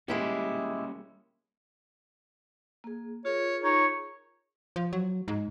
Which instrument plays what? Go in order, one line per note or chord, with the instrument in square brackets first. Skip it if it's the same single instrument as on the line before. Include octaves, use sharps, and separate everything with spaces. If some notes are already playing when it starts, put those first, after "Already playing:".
[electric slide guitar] G3 A#3 C#4 [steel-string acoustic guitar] G#3 E4 G4
[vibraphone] A#3 G#4
[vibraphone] F4 G#4 A#4 [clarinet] C#5
[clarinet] D#4 [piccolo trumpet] C#5
[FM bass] F3
F#3
G#2